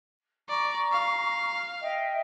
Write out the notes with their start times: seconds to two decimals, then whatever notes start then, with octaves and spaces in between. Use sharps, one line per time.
0.49 D5 A#5 C#6
0.92 F5
1.81 D#5 E5 G5